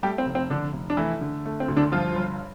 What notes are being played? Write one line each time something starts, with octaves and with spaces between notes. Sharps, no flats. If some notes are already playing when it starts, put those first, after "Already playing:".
G3 A3 G4
C4
F1
C4
F1 D3 D4
F1
D4
E3 A3 E4
D3
A3
C4
D2
D3 D4
G2 F3 F4
G1